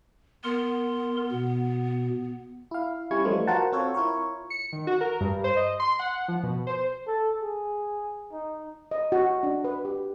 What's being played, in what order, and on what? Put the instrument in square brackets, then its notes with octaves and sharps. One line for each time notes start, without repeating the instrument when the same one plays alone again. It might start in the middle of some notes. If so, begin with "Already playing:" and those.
[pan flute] B3 [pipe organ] A#4 C6
[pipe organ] B2
[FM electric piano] E4 F5
G3 C#4 E4 C#6 G#6
E3 F3 G3 A3 D#4 F4
F4 F#4 A#4 C5 F#5 A5
C4 F4 F#4 A4 C5 C#5
E4 F4 A#4 C#5
[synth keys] C#7
D#3
F#4
A#4
G2
C5
D#5
C6
F#5
F3
B2
C5
[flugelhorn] A4
G#4
D#4
[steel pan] D#5
F#4
D4
B4
G4